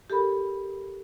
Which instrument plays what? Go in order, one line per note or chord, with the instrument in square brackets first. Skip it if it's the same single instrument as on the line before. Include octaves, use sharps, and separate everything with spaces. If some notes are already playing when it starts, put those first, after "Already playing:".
[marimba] G4 A4 A#4 B5